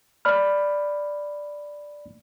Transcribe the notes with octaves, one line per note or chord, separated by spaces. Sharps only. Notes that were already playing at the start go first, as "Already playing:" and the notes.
D5 B5 F6